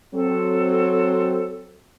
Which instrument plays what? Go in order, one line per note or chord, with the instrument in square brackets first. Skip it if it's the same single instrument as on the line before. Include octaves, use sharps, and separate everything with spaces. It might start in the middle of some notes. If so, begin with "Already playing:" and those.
[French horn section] F#3 C4 [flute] A4